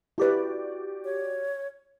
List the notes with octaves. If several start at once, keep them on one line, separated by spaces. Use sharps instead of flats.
E4 F#4 G4 B4 D5
C#5